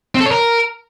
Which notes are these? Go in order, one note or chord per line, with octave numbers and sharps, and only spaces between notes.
C4
A4
C#5
A#4